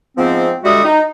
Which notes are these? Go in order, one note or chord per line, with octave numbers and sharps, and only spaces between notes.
G#2 F3 B3 C4
D3 G3 G#3 F#4 E5 D#6
D#4